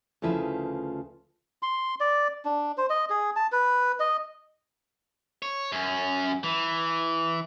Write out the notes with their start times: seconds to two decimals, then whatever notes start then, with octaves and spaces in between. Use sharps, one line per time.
0.22 D2 C#3 F3 E4 B4
1.63 C6
2.00 D5
2.45 D4
2.77 C5
2.90 D#5
3.10 G#4
3.36 A5
3.52 B4
4.00 D#5
5.42 C#5
5.72 F#2 C#4
6.43 E3